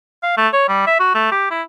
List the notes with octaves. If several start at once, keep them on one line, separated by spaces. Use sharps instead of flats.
F5
A3
C#5
G3
E5
F#4
A3
G4
E4